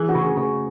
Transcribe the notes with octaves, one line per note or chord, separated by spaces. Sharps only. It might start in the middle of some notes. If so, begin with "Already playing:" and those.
Already playing: E3 G#4
F#4
C#3
G#4
C#3 G#4